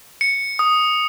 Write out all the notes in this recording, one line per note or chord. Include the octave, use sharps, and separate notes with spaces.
C#7
D#6